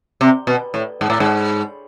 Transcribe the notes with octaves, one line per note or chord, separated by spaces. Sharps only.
C3
B2
A2
G#2
A2
G#2